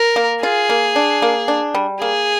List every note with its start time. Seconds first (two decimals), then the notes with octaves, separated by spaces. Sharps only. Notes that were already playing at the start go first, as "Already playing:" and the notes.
Already playing: A#4
0.16 A#3
0.43 F4 G#4
0.70 A#3
0.96 D4
1.22 A#3
1.48 D4
1.75 G3
2.01 A#3 G#4